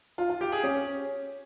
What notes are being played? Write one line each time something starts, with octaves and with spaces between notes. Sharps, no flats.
F4
F4
G4
G#4
C#4